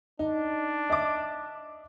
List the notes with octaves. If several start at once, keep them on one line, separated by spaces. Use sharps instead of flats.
D4 D#4
D#5 E5 D6